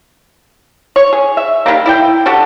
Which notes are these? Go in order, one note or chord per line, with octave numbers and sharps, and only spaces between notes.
C#5
G#4
E5
D#3 G3 A#3
E4 D5 G5
D4 F#4 G4 A4